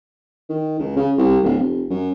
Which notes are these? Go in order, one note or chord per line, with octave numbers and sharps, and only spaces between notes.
D#3
C#2
C#3
C2
D1
F1
F#2